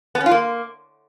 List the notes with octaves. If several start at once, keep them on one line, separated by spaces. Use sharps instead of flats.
B3
C#4
F4
A#3